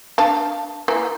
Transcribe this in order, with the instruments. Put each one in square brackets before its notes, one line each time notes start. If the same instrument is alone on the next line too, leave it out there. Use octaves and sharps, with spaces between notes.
[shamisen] D4 F5 A5
E3 A#3